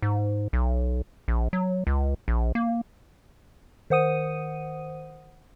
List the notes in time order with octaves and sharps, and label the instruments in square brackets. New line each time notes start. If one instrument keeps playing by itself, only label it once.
[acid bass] G#2
B1
A#1
F#3
C#2
A#1
A#3
[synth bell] D#3 C5 F#5 D#6 D#7